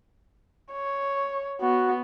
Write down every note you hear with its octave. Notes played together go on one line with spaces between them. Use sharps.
C#5
B3 F#4